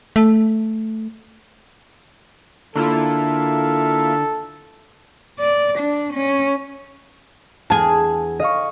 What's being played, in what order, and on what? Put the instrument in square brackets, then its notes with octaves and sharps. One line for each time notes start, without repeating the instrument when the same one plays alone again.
[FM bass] A3
[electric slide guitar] D3 [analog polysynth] A#3 E4 F4 [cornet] A4
[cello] D5
D4
C#4
[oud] E2 G#4 [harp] G#5 A5
[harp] D#5 F5 C#6